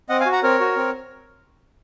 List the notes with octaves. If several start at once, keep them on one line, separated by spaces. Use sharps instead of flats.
C4 D#5 F#5
F5 G#5
F#4
F#5 A#5
C4 A#4 C#5
F#4
C4